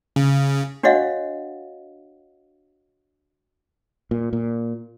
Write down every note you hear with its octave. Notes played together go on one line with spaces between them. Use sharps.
C#3
D4 F#4 C#5 D#5 F5 F#5
A#2
A#2